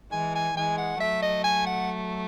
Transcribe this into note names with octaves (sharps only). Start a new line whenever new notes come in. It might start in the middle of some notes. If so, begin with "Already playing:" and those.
E3 G#3 G#5
G#5
E3 G#3 G#5
F#5
F#3 A3 E5
D#5
G#5
F#5